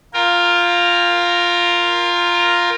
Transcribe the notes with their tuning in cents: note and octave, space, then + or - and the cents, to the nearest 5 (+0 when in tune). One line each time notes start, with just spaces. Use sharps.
F4 +0 A#4 +0 G5 +40